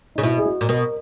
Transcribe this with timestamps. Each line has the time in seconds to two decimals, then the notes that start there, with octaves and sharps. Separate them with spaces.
0.16 C#3 D#4
0.23 B2 E4
0.38 G#4
0.46 F#4
0.61 A#2
0.69 B2 A#4